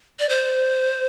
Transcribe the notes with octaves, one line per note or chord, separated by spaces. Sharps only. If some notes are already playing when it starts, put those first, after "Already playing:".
D5
C5